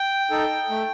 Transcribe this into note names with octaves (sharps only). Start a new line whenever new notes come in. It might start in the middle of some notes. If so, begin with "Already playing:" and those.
Already playing: G5
D#4 A4
A3